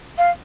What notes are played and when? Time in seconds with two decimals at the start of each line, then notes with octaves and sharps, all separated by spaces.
0.18 F5